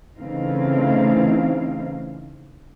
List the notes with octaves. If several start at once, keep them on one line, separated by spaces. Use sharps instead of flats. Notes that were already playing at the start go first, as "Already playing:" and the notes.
C#3 E3 A3 C4 D#4 F5